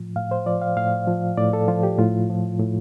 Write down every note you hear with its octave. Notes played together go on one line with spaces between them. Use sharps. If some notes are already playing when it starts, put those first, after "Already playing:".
Already playing: A2 F3
A2 F5
C5
F3 D5
F5
A2 F5
F3
A2 D5
A4
F3 F4
G4
A2 F4
F3
A2